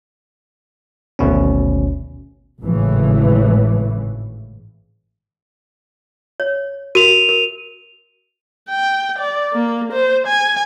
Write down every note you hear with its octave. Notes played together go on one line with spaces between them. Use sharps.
G#1 D2 B2 C#4
G#1 A2 C#3 E3
C#5
F#4 A#4 D#7 F7
A#4
G5
D5
A#3
C5
G#5